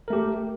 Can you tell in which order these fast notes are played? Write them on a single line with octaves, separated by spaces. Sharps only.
A#4 A3 G4